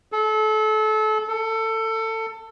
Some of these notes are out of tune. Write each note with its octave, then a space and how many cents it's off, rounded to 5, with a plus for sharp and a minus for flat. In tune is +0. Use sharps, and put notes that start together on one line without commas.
A4 -30
A4 +20